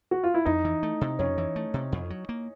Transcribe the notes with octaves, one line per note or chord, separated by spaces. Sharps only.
F#4
F4
E4
F2 D#4
E3
A3
C3
F2 C#4
E3
A3
C3
F2
F#3
A#3